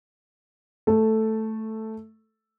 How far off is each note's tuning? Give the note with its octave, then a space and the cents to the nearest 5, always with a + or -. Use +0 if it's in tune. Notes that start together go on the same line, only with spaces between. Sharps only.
A3 +0 A4 +0